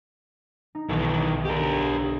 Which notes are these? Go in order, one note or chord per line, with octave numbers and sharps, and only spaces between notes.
D#4
B1 D#3 E3
B2 D3 G4 A#4 D5